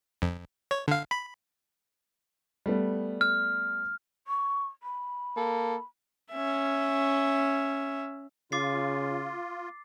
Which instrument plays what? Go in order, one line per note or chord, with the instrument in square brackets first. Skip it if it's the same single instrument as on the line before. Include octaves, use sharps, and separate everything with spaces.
[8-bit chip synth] F2
C#5
D3 F5
B5
[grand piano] G3 A3 B3
[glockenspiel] F6
[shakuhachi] C#6
B5
[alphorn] A#3 [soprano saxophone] A4
[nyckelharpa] C#4 E5
[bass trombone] C#3 [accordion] F4 [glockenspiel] D6 A6 C7